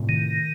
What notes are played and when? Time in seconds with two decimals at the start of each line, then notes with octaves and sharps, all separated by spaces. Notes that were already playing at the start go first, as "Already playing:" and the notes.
Already playing: A2 C3
0.09 D#3